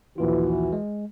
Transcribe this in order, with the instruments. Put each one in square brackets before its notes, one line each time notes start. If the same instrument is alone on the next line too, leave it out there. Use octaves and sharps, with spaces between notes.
[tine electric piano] A#1 D#2 F4 [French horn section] E3 F#4
[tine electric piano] G#3